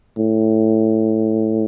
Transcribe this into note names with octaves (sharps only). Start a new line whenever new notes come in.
A2